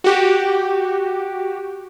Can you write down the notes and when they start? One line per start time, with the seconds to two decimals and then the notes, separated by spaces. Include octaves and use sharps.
0.04 F#4 G4